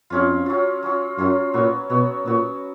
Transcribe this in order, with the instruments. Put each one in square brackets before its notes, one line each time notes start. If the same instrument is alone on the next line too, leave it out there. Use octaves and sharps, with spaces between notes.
[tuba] F2 [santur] F#3 C#4 F4
[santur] F#3 C#4 F4
F#3 C#4 F4
[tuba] F#2 [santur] F#3 C#4 F4
[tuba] A#2 [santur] F#3 B3 F#4 C#5
[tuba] B2 [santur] F#3 B3 F#4 C#5
[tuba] A#2 [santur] F#3 B3 F#4 C#5